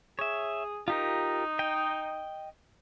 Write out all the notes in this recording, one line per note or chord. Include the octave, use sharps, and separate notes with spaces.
G#4 C#5 E5
D#4 F4 G4 A#4
D#5 G5